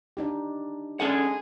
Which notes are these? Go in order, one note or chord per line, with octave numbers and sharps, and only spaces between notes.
D4 D#4 G4
G#3 C#4 G#4 A4 F#5